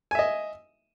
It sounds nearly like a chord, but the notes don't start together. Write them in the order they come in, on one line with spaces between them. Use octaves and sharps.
G#5 E5 D#5